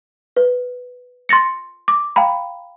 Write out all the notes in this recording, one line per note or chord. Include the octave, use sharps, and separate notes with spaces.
B4
C6 A6 A#6 C#7
D6
F5 G5 A#5 B5